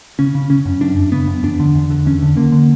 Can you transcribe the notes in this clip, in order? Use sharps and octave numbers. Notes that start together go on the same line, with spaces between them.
C#3 C#4
C#3
C#3 C#4
F#2
F#2 D4
F#2
C#3 B3
F#2
E2 D4
D3
E2
D3
E2 C#4
D3
D3 A#3
D3